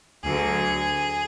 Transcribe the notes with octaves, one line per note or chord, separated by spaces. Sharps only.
D2 D3 F#3 G#4